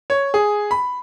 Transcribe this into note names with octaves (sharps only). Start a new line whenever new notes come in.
C#5
G#4
B5